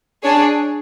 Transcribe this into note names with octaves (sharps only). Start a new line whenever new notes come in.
D4 G#4 C#5